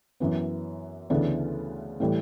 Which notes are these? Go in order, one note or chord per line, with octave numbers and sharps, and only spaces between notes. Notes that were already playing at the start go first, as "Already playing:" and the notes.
F#2 E3 B3
D2 C#3 E3 B3 D4
A2 E3 G3